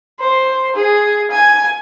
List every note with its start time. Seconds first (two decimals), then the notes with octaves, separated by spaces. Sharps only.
0.20 C5
0.75 G#4
1.31 G#5